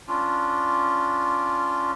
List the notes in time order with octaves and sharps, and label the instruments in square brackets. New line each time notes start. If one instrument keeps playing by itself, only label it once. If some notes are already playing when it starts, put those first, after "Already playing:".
[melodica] C#4 D4 F4